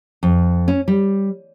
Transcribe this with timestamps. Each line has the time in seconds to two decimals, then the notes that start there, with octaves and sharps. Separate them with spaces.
0.23 F2
0.68 C#4
0.88 G3